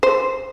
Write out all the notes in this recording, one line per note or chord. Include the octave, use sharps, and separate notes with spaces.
C5